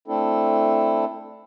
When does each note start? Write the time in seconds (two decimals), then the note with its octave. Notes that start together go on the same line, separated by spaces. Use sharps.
0.08 A3 C4 D4 E4 A4